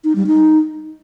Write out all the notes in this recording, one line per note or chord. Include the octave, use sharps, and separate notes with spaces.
D#4
G3
D#4